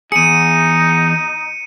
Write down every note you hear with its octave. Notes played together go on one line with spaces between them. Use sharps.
E2 D#4 G#4 C#7 D#7